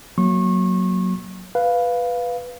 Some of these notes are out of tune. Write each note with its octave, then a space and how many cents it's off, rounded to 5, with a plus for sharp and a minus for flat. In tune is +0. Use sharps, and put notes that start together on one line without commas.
F#3 +0 A#3 +0 C#6 -30
B4 +0 F5 +0